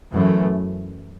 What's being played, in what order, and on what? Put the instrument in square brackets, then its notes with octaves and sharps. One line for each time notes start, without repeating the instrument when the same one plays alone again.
[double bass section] F#2 E3 A3